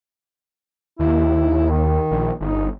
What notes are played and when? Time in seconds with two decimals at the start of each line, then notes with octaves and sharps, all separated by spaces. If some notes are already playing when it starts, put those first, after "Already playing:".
0.99 D#2 E4
1.71 D#3
2.11 A#1
2.40 G1 D#4